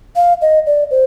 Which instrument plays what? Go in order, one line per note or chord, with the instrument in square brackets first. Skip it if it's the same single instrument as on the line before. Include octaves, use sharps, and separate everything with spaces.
[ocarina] F5
D#5
D5
C5